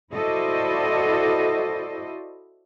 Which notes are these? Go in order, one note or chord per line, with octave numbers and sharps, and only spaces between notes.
E4 F#4 A4 C5 D5 D#5